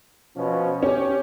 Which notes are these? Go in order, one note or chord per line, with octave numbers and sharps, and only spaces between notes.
B2 F3 C#4
C#4 G4